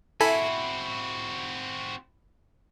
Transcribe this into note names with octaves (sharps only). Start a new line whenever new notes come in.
C4 E4 F#4 A4 G#5 B5